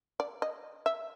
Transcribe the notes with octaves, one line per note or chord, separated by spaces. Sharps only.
D5
D#5
E5